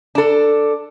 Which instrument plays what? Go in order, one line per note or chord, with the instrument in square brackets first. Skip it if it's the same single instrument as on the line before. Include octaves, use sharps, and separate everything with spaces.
[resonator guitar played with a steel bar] D4 A4